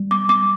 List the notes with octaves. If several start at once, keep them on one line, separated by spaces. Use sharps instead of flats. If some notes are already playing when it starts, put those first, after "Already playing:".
Already playing: G3
D6
D6